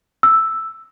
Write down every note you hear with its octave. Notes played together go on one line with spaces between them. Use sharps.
E6